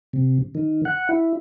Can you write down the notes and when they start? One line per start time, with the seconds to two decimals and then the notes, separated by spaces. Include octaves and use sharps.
0.13 C3
0.55 D#3
0.85 F#5
1.09 E4